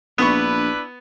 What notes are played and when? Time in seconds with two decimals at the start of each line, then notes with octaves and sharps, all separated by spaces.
0.18 A#1 B3 D4 E4 B4 C#6